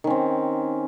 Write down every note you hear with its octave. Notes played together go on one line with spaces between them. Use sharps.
D#3 C4 C#4